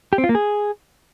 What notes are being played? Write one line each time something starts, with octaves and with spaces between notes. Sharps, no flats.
G4
C4
F4
A#3
G#4